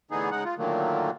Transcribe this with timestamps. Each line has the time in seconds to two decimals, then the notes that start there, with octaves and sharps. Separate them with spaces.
0.11 A2 D3 E3 B3 D#4 G#4
0.31 C#3 G#3 D#4 F#5
0.45 F4
0.58 A#2 D3 D#3 F#3 A3 A#3